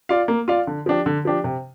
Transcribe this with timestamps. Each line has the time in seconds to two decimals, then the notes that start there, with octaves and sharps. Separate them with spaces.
0.09 F4 D5 F5
0.28 A#3
0.48 F4 D5 F5
0.67 D3
0.86 F3 D4 G4
1.06 D3
1.25 F3 D4 G4
1.44 C3